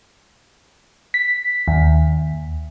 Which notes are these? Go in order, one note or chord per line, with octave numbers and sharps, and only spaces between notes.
B6
D#2